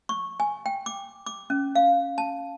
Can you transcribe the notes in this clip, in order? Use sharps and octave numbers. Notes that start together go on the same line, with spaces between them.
C#6
G#5
G5
D6
D6
C#4
F5
A5